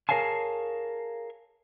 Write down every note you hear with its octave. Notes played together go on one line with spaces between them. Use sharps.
G#4 A#4 C#5 F5 G#5 A5